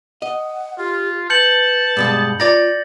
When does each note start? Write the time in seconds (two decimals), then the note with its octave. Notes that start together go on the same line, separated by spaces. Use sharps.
0.22 D#5 F#5
0.78 F4 G4
1.30 B4 A5 G6 C#7 F#7
1.97 G2 B2 G#3
2.40 F4 C#5 D5 A#5 A6 A#6